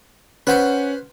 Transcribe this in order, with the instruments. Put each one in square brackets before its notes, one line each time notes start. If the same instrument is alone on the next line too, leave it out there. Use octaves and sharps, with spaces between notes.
[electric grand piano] C#4 F#5 [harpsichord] B4 C5